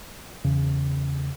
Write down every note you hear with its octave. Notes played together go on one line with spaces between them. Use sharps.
E2 C#3